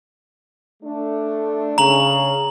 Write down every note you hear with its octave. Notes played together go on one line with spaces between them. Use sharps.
A3 D4
C#3 A#5 F#7